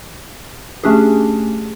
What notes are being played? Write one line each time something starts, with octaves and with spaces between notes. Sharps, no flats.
A3 C#4 D4 G4 G#4